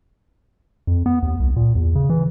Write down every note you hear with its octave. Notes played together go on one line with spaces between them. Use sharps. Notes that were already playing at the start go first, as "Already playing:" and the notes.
F2
B3
D#2
C2
A#2
E2
C#3
E3